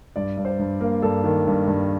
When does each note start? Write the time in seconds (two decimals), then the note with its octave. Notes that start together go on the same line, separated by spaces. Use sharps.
0.16 G2 D5
0.37 G2
0.45 C5
0.59 G2
0.81 A#3
1.02 G2 A4
1.24 D#3
1.47 G2
1.67 G2